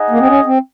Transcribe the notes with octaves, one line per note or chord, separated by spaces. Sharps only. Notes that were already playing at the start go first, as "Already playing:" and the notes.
Already playing: D#4 G#4 D#5 F#5
A#3
C4
C#4
C4